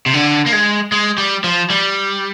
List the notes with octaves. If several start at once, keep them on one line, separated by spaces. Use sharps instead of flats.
C3
D3
A#3
G#3
G#3
G3
F3
G3